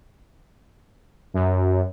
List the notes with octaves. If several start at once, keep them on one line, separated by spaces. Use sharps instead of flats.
F#2